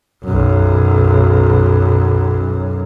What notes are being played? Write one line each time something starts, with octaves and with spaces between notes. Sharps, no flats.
B1 F#2